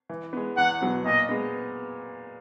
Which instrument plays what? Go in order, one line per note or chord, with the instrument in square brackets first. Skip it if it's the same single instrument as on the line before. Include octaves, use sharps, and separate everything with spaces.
[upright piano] E3
G#3 B3
[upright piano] E2 [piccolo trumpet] F#5
[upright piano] B2 F#3 B3
[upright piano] A#2 [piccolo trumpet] D#5
[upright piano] G#3 B3